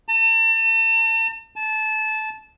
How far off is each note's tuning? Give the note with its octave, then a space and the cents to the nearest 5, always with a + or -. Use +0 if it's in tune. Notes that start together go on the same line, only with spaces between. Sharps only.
A5 +40
A5 -20